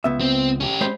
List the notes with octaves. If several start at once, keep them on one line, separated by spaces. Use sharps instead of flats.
C#2 B3 E5
C4
C#4 G4
G#3 C5 B5